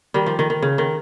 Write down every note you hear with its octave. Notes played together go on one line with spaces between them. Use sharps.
D#3 G3
F3
D#3
D#3
C#3
D#3